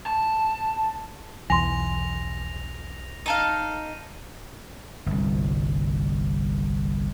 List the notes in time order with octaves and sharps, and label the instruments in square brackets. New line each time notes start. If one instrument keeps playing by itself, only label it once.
[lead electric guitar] A5
[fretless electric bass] B1 E2 E3 [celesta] G#5 C6 [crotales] A#6 F7
[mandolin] D#4 A4 F5 [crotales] D#7
[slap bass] G1 C2